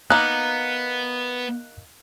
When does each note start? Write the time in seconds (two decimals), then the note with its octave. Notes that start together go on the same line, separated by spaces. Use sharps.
0.10 A#3 B3 D#4 F#6